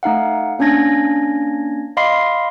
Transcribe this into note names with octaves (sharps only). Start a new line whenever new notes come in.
A3 D#4 F5 F#5
A#3 C#4 D4 G#6 A#6
D#5 F5 B5 C6 D6 C7